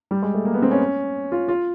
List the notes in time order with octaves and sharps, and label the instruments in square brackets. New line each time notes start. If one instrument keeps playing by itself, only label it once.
[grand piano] G3
G#3
A3
A#3
B3
C4
C#4
F4
F4